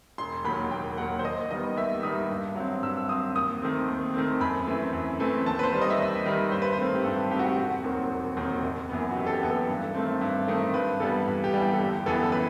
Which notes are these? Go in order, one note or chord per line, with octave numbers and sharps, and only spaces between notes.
E1 C6
D#2 D#3 F#3 B5
E1 G5
D#2 D#3 F#3 F#5
C5
D#2 D#5
D#3 G3 B3 D#5
D#2 E5
D#3 G3 B3 D#6
G2
F#3 C4
G2 E6
F#3 C4 D#6
D#2 D#6
D#3 A3 C4
D#2
D#3 A3 C4
F#2 B5
E3 A3 C4
F#2
E3 A3 C4
D#2 A5
B4
C5
D#3 G3
D#5
E5
D#2 D#5
D#3 G3
G2 C5
B4
C5
D#3 A3 C4
G4
G2 A4
D#3 A3 C4 G4
F#4
G4
E1 F#4
D#2 D#3 F#3 C4
E1
D#2 D#3 F#3 C4
F#1
F#2 E3 B3
F#4
F#1 G4
A4
G4
F#2 E3 B3
A4
G2
D#3 A3 C4
G2
D#3 A3 C4
G2 B4
E3 G3 B3 A4
G2
G4
E3 G3 B3
G4
A4
G1 G4
F#2 E3 B3 A4
A4
B4